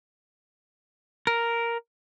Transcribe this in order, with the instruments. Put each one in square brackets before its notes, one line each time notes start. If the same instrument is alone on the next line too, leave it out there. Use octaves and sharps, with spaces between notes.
[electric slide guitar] A#4